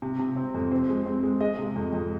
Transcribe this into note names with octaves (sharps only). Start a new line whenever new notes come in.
C3
C3
C4
F2
C4 C5
G#3
C4
G#3
G#3 D#5
C3
F2
F2